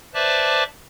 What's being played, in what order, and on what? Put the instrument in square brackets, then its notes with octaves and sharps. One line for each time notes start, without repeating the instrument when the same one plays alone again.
[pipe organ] B4 C5 D5 E5 A5 D6